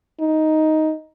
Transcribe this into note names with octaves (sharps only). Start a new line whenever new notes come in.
D#4